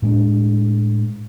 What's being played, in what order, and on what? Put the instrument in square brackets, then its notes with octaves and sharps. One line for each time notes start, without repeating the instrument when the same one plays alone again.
[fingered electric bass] A2 G#3 C4 D4